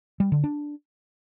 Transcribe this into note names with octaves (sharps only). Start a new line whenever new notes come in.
G3
D3
D4